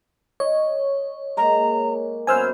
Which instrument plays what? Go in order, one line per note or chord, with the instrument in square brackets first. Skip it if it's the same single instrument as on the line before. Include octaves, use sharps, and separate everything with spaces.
[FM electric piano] C#5 [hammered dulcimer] D#5
[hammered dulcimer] G#3 A#3 [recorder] A#5
[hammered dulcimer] F#2 B3 [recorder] C5 [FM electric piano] G#5 E6 F6